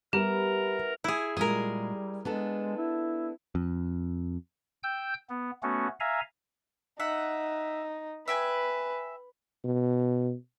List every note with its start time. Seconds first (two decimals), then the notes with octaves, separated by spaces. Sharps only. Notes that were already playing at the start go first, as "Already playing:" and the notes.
0.13 G3 B3 E4 G4 A#4 A#5
1.04 E4 G#4
1.37 A#2 G3 G#3 G#4 A#4
2.25 G#3 B3 D4 A4
2.77 E4
3.55 F2
4.83 G5 E6 G6
5.30 B3
5.63 A3 B3 C#4 F#4
6.00 E5 F5 G#5 A#5
7.00 D#4 E5 F#5
8.28 B4 E5 G5 G#5
9.64 B2